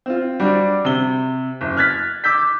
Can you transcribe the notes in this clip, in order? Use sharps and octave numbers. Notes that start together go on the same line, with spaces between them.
C4 F4
G3 D4 F#4
C3 G7
F#1
F6 F#6 G#6 A6 B6
D6 E6 G6 B6